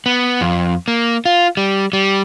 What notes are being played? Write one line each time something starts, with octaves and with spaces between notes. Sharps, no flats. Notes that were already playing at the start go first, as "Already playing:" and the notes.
B3
F2
A#3
F4
G3
G3